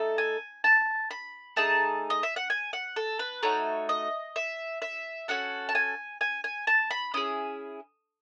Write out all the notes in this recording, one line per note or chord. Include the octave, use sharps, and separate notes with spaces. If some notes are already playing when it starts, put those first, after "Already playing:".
Already playing: A3 D#4 A4
G#5
A5
B5
A3 D#4 G#4 A5
D#5
E5
F#5
G#5
F#5
A4
B4
A3 D#4 F#4 C#5
D#5
E5
E5
C#4 F#4 A4 F#5
A5
G#5
G#5
G#5
A5
B5
C#4 E4 G#4 D#6